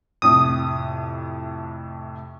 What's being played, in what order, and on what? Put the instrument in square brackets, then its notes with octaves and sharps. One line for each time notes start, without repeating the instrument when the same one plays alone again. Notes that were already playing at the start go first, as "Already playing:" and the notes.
[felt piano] F2 A2 C3 [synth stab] D#6